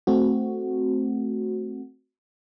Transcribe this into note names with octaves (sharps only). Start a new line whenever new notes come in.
A3 C4 F#4